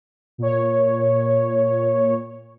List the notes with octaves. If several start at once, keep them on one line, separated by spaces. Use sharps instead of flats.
A#2 C#5